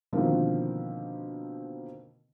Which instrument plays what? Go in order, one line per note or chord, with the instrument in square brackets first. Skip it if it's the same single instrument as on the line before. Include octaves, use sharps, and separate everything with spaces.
[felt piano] B2 D3 D#3 F3 A#3 C4